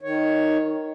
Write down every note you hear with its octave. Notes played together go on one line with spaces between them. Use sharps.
D#3 C#5